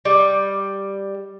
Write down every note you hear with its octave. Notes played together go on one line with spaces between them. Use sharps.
G3